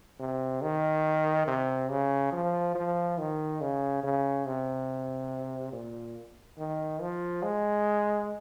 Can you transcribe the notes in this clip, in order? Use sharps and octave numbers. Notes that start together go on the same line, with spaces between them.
C3
D#3
C3
C#3
F3
F3
D#3
C#3
C#3
C3
A#2
D#3
F3
G#3